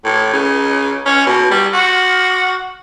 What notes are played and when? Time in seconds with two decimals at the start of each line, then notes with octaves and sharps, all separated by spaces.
0.04 A2
0.33 C#3
1.06 C#4
1.26 B2
1.51 G3
1.73 F#4